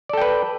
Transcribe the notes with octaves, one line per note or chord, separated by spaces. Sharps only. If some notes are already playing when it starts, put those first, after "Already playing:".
A4 B4 D5 G5